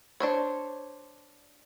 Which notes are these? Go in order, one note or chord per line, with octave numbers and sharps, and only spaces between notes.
D4 C5 C#5